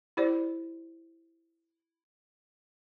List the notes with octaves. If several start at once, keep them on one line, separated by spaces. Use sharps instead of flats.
E4 G4 C5 D5